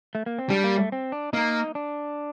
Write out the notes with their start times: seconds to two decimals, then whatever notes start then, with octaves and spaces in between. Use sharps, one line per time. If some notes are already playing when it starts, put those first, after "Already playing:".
0.15 A3
0.26 A#3
0.39 C4
0.49 G3 D4
0.64 A#3
0.78 A3
0.92 C4
1.12 D4
1.33 A#3 D#4
1.75 D4